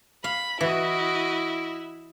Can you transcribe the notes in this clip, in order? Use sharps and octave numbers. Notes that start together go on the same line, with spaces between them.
F5 B5
E3 E4 F#4 D#5